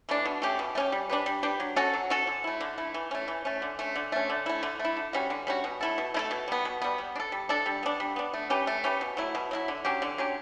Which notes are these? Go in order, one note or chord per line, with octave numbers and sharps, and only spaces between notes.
E3 A3 D4
B2
A3 C#4 G4
B2
A3 C#4 G4
G3
D4 G4 B4
G3
D4 G4 B4
F#3
C#4 F#4 A4
F#3
C#4 F#4 A4
D3
A3 E4
D3
A3 E4
E3
A3 C#4
E3
A3 C#4
D3
A3 C#4
D3
A3 C#4
D3
A3 E4
D3
A3
E4
D3
G3 C#4 F#4
D3
G3 C#4 F#4
B2
A3 E4 A4
B2
A3 E4 A4
B2
G3 B3
B2
G3 B3
G3
D4
A4
G3
D4 A4
G3
B3 D4
G3
B3 D4
A3
C#4 G4 B4
A3
C#4 G4 B4
B2
F#3 A3 E4
B2
F#3 A3 E4
D3
F#3 C#4 G4
D3
F#3 C#4 G4